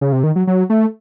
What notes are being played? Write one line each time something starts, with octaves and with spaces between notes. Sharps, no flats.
C#3
C3
D#3
F#3
F#3
A3